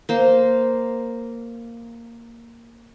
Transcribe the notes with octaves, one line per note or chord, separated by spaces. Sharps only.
A#3 C5